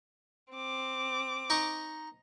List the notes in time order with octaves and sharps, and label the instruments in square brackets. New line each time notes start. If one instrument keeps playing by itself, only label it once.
[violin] C4 D6
[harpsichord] D#4 C#6 D#6